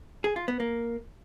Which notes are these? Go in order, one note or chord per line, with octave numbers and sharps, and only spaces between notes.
G#4
F4
B3
A#3